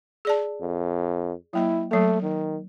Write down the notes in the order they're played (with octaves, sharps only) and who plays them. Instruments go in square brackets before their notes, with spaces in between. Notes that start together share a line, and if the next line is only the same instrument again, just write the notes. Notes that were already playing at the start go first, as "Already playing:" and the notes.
[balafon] G#4 D5 A5
[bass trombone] F2
[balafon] F#3 A#3 D#5 [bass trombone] E4
[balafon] F#3 A#3 [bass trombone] A3
[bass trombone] D#3